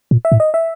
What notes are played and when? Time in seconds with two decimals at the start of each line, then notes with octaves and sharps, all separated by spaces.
0.11 A#2
0.25 E5
0.32 A2
0.40 D#5
0.54 E5